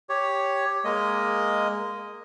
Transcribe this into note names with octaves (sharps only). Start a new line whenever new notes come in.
G4 C#5
G#3 A#3 D#5